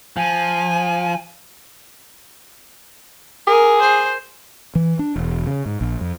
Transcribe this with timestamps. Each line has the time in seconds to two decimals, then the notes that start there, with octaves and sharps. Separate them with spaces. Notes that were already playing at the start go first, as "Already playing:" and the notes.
0.17 F3 G#5
3.47 G#4 A#4
3.81 C5
4.75 E3
4.99 D4
5.16 E1
5.47 C#3
5.66 G#2
5.81 A#1
6.01 F2